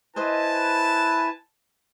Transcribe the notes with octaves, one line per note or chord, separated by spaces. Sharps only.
E4 B4 C5 D#5 G#5 A5